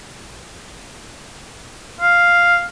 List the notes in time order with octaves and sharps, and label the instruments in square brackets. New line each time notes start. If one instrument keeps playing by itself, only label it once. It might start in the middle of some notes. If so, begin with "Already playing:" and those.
[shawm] F5